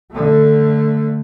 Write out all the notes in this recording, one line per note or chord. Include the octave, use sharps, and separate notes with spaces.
D3 A3